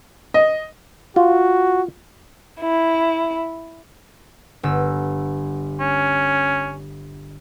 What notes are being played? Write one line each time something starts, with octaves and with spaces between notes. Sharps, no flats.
D#5
F4 F#4
E4
G1 E6
C#4